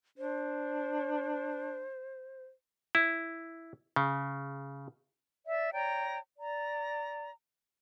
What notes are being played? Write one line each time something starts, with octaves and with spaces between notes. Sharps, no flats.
D4 C5
E4
C#3
D5 E5
C#5 D5 G5 A#5
D5 A#5